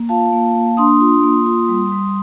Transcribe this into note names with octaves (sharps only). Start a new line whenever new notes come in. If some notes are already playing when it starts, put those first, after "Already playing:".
Already playing: A#3
F4 F5 A5
A#3
A#3
D4 C6 D#6
F4
A#3
F4
G3
G3